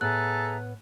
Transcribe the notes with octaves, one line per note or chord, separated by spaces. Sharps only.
A2 B3 G#4 A4 E5 A#5 F#6